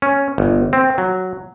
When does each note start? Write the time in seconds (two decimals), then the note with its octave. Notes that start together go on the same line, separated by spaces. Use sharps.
0.02 C#4
0.38 G1
0.73 C4
0.98 F#3